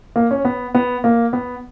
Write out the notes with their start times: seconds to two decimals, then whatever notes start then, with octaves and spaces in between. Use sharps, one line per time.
0.16 A#3
0.31 C#4
0.45 B3
0.75 B3
1.04 A#3
1.33 B3